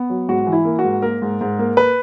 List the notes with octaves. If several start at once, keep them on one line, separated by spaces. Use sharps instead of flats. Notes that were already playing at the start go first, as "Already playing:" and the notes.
Already playing: B3
F#3
G#2 F#4
E3
E4
A#3
F#4
G#2
A#3 A#4
G#2
G#2
A#3
B4